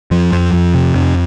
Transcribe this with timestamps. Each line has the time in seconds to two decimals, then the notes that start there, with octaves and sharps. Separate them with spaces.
0.11 F2 F3
0.32 F2
0.53 F2
0.74 C3
0.95 F2